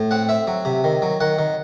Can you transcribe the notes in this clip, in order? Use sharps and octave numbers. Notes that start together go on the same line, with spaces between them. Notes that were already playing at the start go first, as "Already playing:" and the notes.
Already playing: A2
C4 F#5
C4 E5
F#3
C3
D#3
F#3
D#3 F#5
D#3